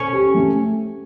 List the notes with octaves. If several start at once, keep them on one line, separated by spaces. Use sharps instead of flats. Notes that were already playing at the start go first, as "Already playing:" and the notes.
Already playing: C#4
G4
A3